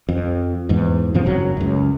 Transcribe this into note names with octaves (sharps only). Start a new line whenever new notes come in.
F2
E2 G#2
G2 B2 F3 C4
F#1 F#3
C#2 F#2